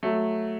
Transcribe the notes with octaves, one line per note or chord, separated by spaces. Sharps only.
F#3 A3